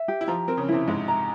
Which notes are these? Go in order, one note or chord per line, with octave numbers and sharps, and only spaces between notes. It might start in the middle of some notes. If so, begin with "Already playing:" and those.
Already playing: E5
G4
E4
F3 F4 A#5
C4 A#4
C#3 C#4
C3 C4 E4
G#2 G#3 E5
A#5